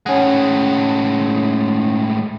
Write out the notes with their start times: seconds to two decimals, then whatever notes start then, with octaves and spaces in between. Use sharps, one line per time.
0.06 A2 G#3 C#4 F#5